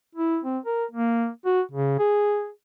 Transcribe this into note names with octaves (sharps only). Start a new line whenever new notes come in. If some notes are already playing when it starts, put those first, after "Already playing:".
E4
C4
A#4
A#3
F#4
C#3
G#4